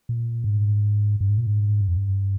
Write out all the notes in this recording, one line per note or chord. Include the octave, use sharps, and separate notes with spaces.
A#2
G#2
G2
G#2
A#2
G#2
G2
F2
G2